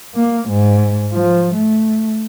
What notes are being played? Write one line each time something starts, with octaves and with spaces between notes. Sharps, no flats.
A#3
G#2
F3
A3